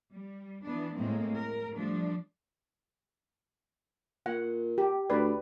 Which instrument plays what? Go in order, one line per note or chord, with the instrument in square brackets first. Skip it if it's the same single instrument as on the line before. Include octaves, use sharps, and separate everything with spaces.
[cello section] G3
E3 B3 D4
A2 G#3 A#3 C4
A#4
F3 G3 A3 D4
[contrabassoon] A#2 [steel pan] F#5
[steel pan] G4
[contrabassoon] D2 [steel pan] B4 D5